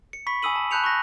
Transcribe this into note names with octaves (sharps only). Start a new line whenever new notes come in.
C#7
B5 C#6 B6
G#5 B5 D#6 E6 D#7 F#7
A5
A5 B5 F#6 G6 C#7 F7
C#6 F#6 A#6